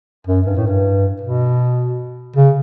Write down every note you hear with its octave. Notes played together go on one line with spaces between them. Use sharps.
F#2
G2
A2
G2
B2
C#3